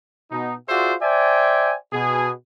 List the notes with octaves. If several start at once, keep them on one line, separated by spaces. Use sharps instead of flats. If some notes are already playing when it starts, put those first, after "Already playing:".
B2 D#4
F4 F#4 G#4 C5 D5 E5
C5 D5 E5 G5 G#5
B2 G#4